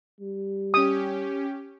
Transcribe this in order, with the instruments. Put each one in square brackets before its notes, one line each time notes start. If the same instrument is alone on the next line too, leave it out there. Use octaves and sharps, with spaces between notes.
[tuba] G3
[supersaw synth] C#4 G4 [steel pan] D#6